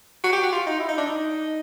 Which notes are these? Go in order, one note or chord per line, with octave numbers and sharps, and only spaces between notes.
F#4
G4
F#4
F4
D#4
E4
D#4
D4
D#4